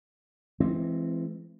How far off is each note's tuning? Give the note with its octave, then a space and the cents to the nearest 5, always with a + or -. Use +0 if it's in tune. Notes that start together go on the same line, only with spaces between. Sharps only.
E3 +25 G#3 +35 C4 +0